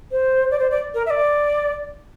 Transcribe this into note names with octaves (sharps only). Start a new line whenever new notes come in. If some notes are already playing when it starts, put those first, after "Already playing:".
C5
D5
C5
D5
A#4
E5
D5